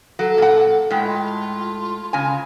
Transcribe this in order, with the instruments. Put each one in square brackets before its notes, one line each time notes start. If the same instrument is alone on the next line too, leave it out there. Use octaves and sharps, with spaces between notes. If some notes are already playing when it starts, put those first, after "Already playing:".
[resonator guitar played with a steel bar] F#3 [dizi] A4
[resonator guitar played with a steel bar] A#2 F#5
[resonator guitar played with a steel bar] A2 G#3 [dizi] G5
[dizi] F4
[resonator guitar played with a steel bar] C#3 G#5 [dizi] F4